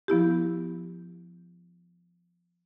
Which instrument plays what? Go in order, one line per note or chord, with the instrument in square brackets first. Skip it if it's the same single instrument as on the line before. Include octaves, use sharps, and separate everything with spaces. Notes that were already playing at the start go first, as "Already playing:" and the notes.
[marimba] F3 B3 E4 G4